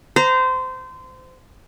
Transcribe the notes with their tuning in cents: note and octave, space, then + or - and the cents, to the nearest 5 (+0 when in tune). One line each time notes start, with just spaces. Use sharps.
C5 -25 A#5 +0